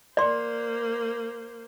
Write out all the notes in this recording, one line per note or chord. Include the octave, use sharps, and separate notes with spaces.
A#3 C5 D5 C6